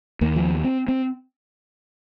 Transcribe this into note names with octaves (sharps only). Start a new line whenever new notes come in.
D#2 A#3
F3
C4
C4